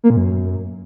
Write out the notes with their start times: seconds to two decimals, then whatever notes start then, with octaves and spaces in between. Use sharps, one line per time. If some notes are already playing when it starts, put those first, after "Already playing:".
0.04 A#3
0.10 A#2
0.17 F#2